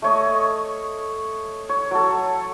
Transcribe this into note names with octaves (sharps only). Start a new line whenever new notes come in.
A3 C#5 D#5
C#5
F#3 A4